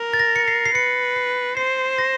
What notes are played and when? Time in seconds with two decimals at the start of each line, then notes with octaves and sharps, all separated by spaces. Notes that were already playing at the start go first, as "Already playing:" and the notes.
Already playing: A#4
0.14 A6
0.19 A#6
0.36 C#7
0.48 C7
0.66 C7
0.75 B4 C#7
1.16 C7
1.57 C5 C7
1.98 A#6